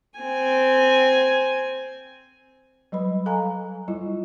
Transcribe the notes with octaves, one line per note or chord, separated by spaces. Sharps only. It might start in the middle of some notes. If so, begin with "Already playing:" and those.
C4 G#5
F#3 G3 B4 B5
A4 F5 G#5 A#5
G3 E4 F4